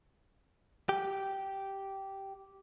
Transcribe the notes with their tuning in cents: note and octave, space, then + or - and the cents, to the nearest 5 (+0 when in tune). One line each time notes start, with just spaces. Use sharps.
G4 -10